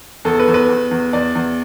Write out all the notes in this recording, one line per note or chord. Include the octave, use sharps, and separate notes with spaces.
E2 A4
B4
E2
B4
E2
E2
E2 D5
E2